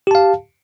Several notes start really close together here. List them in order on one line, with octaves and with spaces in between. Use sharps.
G4 A5 F5